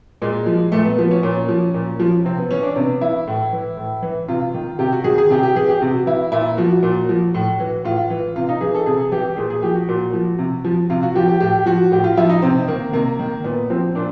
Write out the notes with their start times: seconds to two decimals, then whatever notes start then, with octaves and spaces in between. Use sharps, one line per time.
0.22 A#2 G#3
0.46 F3
0.72 A#2 A3
0.85 B3
0.98 F3 B3
1.11 C#4
1.23 A#2
1.49 F3
1.74 A#2
2.00 F3
2.24 C3 C4
2.38 B3
2.51 E3 C#4
2.63 D4
2.75 C3 B3
3.01 E3 E4
3.27 A2
3.53 E3
3.77 A2
4.03 E3
4.28 C3 F4
4.54 D#3
4.79 C3 G4
4.92 F#4
5.04 D#3 G#4
5.18 G#4
5.30 C3 G4
5.43 G4
5.55 E3 G#4
5.69 G4
5.82 C3 F#4
6.06 E3 E4
6.32 A#2 E4
6.57 F3 F#4
6.83 A#2
7.09 F3
7.34 A2
7.60 E3
7.85 A2 F4
8.10 E3
8.36 C3 F4
8.49 D#4
8.61 E3 G#4
8.74 A4
8.86 C3 G#4
9.12 E3 G4
9.37 A#2 G#4
9.50 G#4
9.62 F3 G4
9.75 F#4
9.89 A#2
10.13 F3
10.39 C3
10.65 F3
10.90 C3 F4
11.02 F#4
11.15 F3 G4
11.28 G4
11.40 A2 G4
11.66 F3 F#4
11.92 A2 G4
12.04 F4
12.17 F3 E4
12.29 D#4
12.42 C3 C4
12.68 D#3 A#3
12.93 C3 A#3
13.19 D#3
13.44 A#2 B3
13.70 F3 C4
13.95 A#2 D4